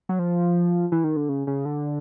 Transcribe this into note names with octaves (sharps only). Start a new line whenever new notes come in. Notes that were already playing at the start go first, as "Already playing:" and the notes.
F#3
F3
E3
D#3
D3
C#3
C#3
D3